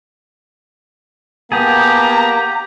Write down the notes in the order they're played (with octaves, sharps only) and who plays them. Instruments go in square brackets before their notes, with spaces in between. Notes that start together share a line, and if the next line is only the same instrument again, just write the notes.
[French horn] A#3 [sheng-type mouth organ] B3 A5 [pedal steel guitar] G4 G#4 [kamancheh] A#5